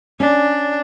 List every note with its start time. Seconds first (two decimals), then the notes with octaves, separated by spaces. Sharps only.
0.20 C#4 D4